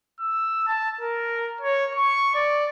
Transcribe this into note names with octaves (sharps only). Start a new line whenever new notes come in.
E6
A5
A#4
C#5
C#6
D5